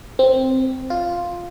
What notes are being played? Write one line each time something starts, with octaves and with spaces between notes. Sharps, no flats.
C4
F4